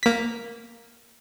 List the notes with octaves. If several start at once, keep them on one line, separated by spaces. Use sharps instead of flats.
A#3 B6